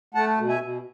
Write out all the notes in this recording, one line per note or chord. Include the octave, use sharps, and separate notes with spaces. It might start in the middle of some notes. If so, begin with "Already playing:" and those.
A3 F#5 A5
B2
E5 G#5
B2